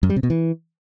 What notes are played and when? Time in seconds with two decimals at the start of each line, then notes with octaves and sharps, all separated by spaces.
0.03 F#2
0.10 G3
0.16 C3
0.23 B2
0.30 E3